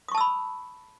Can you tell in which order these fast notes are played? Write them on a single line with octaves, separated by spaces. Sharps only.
D#6 C#6 A5 E6 B5